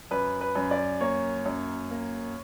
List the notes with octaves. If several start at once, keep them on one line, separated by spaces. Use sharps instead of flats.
F#2 B4
B4
F#2
D5
A#3 C#5
F#2
A#3